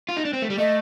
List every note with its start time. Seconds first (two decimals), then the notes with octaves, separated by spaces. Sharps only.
0.09 F4
0.17 D#4
0.25 D4
0.33 C4
0.42 A3
0.50 G3
0.58 A3 D#5